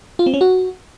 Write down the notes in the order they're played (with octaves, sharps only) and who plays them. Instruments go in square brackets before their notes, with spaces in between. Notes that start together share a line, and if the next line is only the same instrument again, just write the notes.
[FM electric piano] F4
C4
C#4
F#4